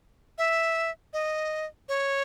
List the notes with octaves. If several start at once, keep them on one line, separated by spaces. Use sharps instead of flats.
E5
D#5
C#5